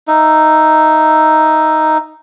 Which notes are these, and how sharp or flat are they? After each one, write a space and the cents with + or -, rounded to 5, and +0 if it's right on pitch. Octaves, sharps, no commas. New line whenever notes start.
D#4 +0 E5 +5